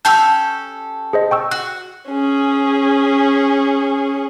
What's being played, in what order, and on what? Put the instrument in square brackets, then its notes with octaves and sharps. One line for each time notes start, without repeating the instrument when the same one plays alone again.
[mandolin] C#4 G4 A4 [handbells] E6 G6
[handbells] G#4 C5 D#5
G5 C#6 E6
[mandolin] F#4 [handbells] F#6
[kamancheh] C#4 G#4